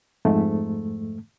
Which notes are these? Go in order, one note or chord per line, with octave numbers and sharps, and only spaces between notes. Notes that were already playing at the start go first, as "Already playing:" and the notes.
F2 G#2 A3